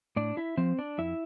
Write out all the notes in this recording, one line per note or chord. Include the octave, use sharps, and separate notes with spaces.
A2 D4 D5
E4 E5
F3 C4 C5
D4 D5
F2 E4 E5